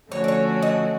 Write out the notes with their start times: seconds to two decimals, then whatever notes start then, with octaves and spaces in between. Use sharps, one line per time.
0.12 D3 F3 A3 C#4 F#4 C#5
0.24 D5
0.28 C#5
0.62 D#5